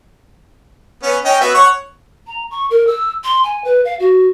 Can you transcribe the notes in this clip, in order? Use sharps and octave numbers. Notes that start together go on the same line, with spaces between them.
B3 C#4
C#4 D#5 G5
B3 F#4 E5
C#5 F#5 C#6
A#5
C#6
A#4
E6
C6
G#5
B4
F5
F#4